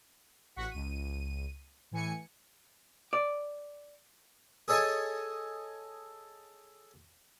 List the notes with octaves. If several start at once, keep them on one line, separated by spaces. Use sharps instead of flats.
A1 F#4 F#5 C#6 B6
C#2 D#7
A2 E3 G#5 C#7
D5
G#4 A4 C#5 D#5 G#5 A5